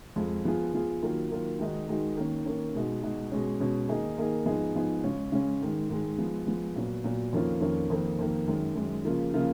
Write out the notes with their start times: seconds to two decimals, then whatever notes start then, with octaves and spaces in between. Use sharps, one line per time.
0.16 F2 F3 G#3
0.45 F3 B3 F4 G#4
0.73 F3 B3 F4 G#4
1.03 D#3 F#3 A#3 F4
1.31 D#3 F#3 A#3 F4
1.59 D#3 G#3 D#4 F#4
1.88 D#3 G#3 D#4 F#4
2.17 D#3 A#3 C#4
2.46 D#3 A#3 C#4
2.75 B2 G#3 D#4 F#4
3.03 B2 G#3 D#4 F#4
3.31 B2 G#3 C#4
3.60 B2 G#3 C#4
3.88 D#3 A#3 D#4 G#4
4.17 D#3 A#3 D#4 G#4
4.46 G#2 F3 B3 D#4 G#4
4.75 G#2 F3 B3 D#4 G#4
5.04 C#3 G#3 C#4
5.32 C#3 G#3 C#4
5.61 G#2 D#3 G#3
5.89 G#2 D#3 G#3
6.18 F3 G#3 B3
6.47 F3 G#3 B3
6.76 A#2 F#3 B3
7.04 A#2 F#3 B3
7.33 F2 D#3 A#3 C#4 F4
7.61 F2 D#3 A#3 C#4 F4
7.90 F2 D#3 A#3
8.19 F2 D#3 A#3
8.47 F#2 D#3 G#3
8.75 F#2 D#3 G#3
9.04 C#3 F3 A#3 F4
9.34 C#3 F3 A#3 F4